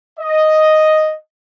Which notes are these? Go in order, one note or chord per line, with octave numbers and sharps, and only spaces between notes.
D#5